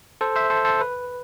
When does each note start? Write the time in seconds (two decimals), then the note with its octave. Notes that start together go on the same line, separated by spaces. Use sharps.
0.21 A4 C5
0.36 C5 E5
0.50 A4 C5
0.65 A4 C5
0.81 B4